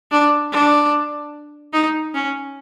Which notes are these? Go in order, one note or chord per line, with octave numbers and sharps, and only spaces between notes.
D4
D4
D#4
C#4